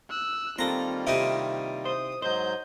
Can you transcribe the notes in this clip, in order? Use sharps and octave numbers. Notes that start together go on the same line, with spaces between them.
E6 F#6
D#3 G3 A#3 C4 F4 A4 A#5
C3 D#4 E4
C5 D#6
G#2 F#3 C5 D#5 G6